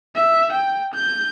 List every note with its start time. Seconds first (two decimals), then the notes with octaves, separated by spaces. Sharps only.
0.15 E5
0.53 G5
0.94 G6